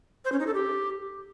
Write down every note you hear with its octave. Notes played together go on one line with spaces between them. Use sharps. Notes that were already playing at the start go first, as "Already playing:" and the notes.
C5
C#4
D#4
A4
G4